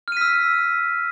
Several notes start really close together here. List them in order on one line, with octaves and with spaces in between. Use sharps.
F6 D#7 B6 E6